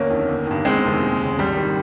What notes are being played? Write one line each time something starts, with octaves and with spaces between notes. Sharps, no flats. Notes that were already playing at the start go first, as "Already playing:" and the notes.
Already playing: G1 A#3 C#4
F2 D#3
G1
G2 D#3
G1 G#3 C4
F2 C3 D#3
D#2
C#3
G#1 G3
D#3